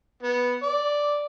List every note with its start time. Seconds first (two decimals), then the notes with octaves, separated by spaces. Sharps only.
0.23 B3
0.63 D5